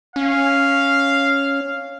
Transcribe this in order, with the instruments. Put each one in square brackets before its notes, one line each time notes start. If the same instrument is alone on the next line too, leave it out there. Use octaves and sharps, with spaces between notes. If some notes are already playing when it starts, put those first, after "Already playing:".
[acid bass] C#4 [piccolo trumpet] F5